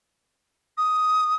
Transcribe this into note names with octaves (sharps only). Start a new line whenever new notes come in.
D#6